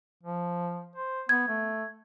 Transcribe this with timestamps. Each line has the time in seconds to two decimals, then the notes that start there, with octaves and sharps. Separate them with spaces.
0.23 F3
0.96 C5
1.29 B3 G#6
1.48 A3